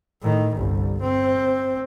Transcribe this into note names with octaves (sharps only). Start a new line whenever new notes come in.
A2 D#3
G1 C2
C4